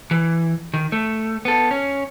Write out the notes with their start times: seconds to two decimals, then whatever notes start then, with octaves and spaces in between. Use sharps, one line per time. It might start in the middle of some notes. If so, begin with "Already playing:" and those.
0.11 E3
0.74 D#3
0.92 A3
1.45 B3 A4
1.71 C#4